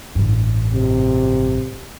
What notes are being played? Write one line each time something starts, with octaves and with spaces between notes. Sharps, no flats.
A1 G2
C3